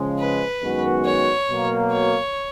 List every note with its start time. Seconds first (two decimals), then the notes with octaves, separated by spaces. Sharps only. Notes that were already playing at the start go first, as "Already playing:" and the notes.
Already playing: C#3 F3 G#3
0.19 B4
0.62 F#2 D#3 G#3 B3 F#4
1.06 C#5
1.50 B2 F#3 A#3
1.93 C#5